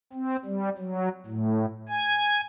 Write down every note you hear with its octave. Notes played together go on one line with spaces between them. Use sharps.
C4
G3
F#3
A2
G#5